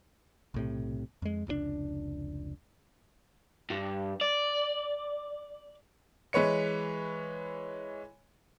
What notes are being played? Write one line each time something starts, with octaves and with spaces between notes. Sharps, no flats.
B1 A2 C3
F2 G#3
F1 C#2 G#2 D4
G2
D5
E3 G#3 B4 C#5 C#7